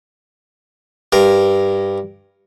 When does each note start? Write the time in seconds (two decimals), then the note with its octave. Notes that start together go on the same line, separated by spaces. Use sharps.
1.12 G2 A#4